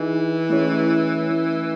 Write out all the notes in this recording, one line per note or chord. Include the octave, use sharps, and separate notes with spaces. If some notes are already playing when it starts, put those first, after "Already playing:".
Already playing: E3 D#4 G#4 D#5 G#5
A3 C#4 E4 G#4 C#5
A3 C#4 E4